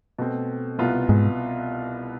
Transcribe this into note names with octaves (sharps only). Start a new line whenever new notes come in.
B2 A3 C4
C2 B2 B3 F4
G#2